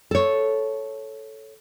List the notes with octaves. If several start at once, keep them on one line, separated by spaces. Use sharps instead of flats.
A4 C#5